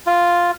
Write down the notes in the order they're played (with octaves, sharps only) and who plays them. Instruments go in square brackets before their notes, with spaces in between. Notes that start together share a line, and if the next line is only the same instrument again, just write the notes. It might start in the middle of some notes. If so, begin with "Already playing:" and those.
[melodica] F4